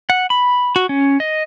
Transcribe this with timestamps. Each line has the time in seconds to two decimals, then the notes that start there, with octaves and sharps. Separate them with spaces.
0.10 F#5
0.30 B5
0.76 F#4
0.89 C#4
1.20 D#5